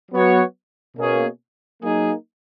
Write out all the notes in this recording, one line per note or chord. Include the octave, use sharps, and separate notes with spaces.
F#3 B3 F#4 C#5
B2 A#3 C#4 G#4
F#3 A#3 D#4 G#4